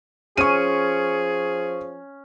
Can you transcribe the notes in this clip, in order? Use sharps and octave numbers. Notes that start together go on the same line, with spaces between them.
F3 C#4 G#4 C#6 D#7